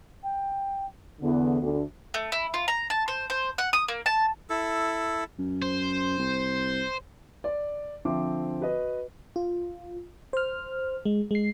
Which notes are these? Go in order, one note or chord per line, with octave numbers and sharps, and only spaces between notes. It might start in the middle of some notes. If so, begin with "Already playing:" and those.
G5
E2 D3 B3
D2
A3
E4
F4
A#5
A5
C5
C5
F#5
D#6
A#3
A5
E4 A4
F#2
C5
C2
D5
D3 F3 C4 C5 E5 D6
F#4 B4 D#5
F4
C5 F6
G#3
G#3 C7